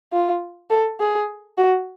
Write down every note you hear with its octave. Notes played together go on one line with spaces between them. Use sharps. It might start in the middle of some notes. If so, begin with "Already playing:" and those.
F4
A4
G#4
F#4